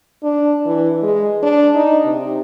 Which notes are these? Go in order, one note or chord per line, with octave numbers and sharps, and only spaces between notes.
D4
E3
G#3
D4
D#4
C3